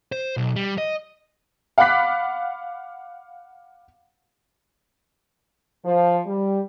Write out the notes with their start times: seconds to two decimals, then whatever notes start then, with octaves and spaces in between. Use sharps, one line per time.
0.12 C5
0.37 B1
0.56 G3
0.78 D#5
1.78 F5 F#5 B5 D6 F#6 B6
5.86 F3
6.27 G3